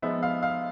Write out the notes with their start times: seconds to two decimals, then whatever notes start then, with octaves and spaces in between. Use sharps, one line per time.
0.02 F3 G#3 B3 D#4 E5
0.23 F5
0.43 F5